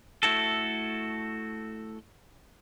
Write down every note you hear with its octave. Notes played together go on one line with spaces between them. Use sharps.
A3 E4 F#4 A4